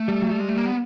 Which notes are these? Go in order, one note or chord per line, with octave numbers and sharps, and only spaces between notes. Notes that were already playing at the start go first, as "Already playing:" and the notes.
Already playing: A3
G3
F#3
G3
G#3
A3
A#3
B3